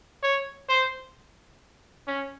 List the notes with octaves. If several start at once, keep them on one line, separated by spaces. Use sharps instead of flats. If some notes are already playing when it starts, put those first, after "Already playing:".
C#5
C5
C#4